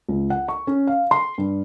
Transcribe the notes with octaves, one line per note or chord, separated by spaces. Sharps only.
C#2
F#5
C#6
C#4
F5
C6
G2